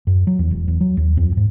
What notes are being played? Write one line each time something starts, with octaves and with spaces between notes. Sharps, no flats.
F#2
F#3
E2
E1
E2
F#3
D#2
F2
G#2